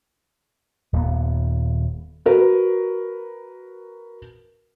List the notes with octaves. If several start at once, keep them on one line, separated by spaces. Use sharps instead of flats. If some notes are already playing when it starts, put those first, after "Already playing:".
D#1 D#2 A#3 B3
F#4 A#4 B4